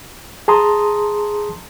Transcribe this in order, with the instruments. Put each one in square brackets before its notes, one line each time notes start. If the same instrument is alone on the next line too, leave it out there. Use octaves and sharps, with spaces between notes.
[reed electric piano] G#4 A5 A#5 C6 D#6